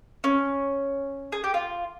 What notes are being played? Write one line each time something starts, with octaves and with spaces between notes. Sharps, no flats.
C#4
G#4
G4
F4